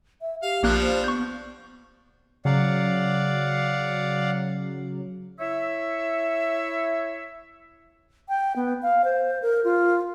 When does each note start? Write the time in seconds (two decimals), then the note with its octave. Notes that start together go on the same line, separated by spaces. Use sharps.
0.21 E5
0.43 G4 F5
0.63 A#1 F3 G3 A#3 D4 F#6
0.81 C5
1.04 B3 C#6 G6
2.45 C#3 F#3 D5 F5 F#5
5.39 E4 C#5 E5
8.29 G5
8.56 B3
8.82 F5
9.05 C5
9.42 A#4
9.64 F4